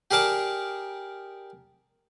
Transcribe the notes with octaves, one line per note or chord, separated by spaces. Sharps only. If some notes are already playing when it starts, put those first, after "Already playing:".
G4 G#4 A#4 D5 A5